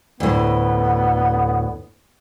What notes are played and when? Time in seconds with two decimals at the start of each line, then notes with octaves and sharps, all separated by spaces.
0.20 D2 A2 B3